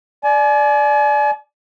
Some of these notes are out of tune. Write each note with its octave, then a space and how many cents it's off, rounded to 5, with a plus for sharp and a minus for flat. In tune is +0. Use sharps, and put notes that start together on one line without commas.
D5 +0 G#5 +40